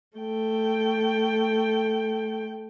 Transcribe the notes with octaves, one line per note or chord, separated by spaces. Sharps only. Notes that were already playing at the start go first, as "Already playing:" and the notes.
A3 G5